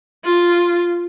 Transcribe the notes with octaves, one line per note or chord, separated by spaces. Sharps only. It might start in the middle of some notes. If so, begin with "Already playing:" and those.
F4